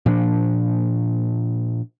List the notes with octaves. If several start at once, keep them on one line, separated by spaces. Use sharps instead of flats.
A#2 F3 D4